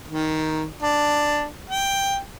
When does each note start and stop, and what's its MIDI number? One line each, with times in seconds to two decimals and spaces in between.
0.08 0.66 51
0.83 1.46 62
1.70 2.17 79